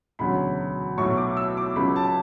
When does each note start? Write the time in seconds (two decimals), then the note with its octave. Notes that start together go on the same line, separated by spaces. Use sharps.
0.19 E1 D2 C#3 F#3 B5
0.97 B1 A2 F#3 C#6
1.17 D6
1.37 E6
1.57 D6
1.76 C#2 C#3 F#3 B5
1.96 A5